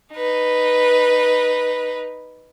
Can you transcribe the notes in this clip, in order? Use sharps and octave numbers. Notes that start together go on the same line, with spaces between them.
D#4 B4